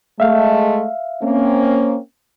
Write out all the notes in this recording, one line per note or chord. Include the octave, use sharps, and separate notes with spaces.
G#3 A3 E5 F5
A#3 C4 C#4